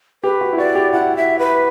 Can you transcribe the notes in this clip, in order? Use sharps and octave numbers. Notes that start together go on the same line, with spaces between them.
G4 B4
F#4
E4
F#4 D5
G4
E4 F#5
E5
B4